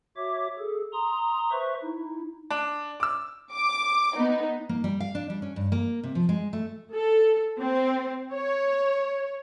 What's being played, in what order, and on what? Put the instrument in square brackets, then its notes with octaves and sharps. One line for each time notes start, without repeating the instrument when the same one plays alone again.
[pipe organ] F#4 C#5 E5 D6
G#4 A4
A#5 C6 D#6
B4 C5 E5 C#6
D#4 E4
[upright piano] D4
D6 E6
[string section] D6
B3 D#4
[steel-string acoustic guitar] A#3
G3
F5
D4
G3
C#4
G2
A#3
C3
F3
G#3
A3
[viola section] A4
C4
C#5